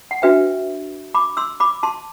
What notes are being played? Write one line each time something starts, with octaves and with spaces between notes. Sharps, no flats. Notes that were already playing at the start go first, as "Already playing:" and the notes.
F#5
D4 F#4 B4 E5 G5
B5 D6
C6 E6
B5 D6
A5 C6